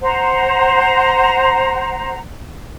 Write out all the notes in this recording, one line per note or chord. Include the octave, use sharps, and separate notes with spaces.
C5 F#5 A#5